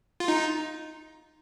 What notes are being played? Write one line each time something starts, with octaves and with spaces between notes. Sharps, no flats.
F4
D#4